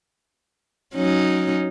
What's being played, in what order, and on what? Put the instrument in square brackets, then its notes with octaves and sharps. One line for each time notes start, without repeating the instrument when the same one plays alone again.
[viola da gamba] F#3 C#4 D#4